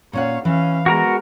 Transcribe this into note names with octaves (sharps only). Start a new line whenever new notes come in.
A#2 C#4 C#5 F5 F#5
E3 C#4 F5
G#3 B3 F#4 A#4 A#5